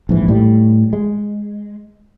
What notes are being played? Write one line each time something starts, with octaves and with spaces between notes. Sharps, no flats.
A#1 G#2 E3
A2 G3
G#3